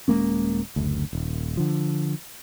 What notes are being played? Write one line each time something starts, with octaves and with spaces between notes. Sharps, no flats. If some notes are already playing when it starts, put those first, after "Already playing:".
D#1 G#3 A#3 C#4
F#1 D2
D#1
D3 F3